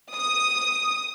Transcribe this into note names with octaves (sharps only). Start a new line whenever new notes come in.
D#6